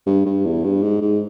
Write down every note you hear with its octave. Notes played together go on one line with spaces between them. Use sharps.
G2
G2
E2
G2
G#2
G#2